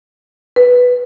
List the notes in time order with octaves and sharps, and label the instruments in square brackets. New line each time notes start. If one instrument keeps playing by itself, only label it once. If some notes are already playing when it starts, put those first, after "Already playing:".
[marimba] B4